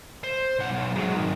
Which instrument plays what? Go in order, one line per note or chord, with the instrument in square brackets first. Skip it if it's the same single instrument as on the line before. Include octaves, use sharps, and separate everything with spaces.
[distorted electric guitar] C5
B1 F#5
B1
F#3 G#3
G#2 D#3